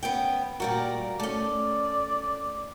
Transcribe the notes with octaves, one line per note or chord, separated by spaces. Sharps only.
B3 C#4 G5
A#2 G3 F#4 A#4
A3 C#4 D5